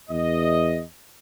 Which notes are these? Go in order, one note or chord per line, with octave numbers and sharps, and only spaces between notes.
E2 D#5